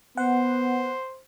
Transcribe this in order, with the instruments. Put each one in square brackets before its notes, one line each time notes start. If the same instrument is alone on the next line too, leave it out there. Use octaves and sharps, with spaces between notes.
[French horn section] B3 [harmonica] C5 [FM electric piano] F#5